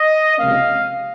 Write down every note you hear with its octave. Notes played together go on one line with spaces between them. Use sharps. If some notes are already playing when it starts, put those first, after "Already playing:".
Already playing: D#5
C#2 C3 F3 A#3 C#4 F5